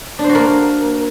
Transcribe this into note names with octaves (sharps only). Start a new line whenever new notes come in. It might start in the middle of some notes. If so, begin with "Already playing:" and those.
D4
C5
F#4
A#3